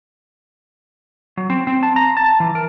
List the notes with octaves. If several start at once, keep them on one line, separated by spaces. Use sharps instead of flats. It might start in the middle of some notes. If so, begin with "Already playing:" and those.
F#3
C4
C4
A5
A#5
A5
E3
A#4